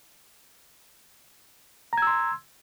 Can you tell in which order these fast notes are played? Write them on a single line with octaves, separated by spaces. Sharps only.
A#5 G#6 E6 C6